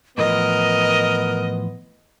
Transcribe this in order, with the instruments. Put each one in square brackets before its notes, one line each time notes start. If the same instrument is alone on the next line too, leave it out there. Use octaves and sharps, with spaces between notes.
[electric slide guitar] A2 E3 F3 [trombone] B3 [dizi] A#4 [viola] D#5